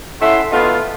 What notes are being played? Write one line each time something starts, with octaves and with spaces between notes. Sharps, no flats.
A3 C#4 E4 E5 F#5 C6
A3 B3 D#4 F4